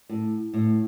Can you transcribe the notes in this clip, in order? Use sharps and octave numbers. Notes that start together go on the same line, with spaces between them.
A2
A2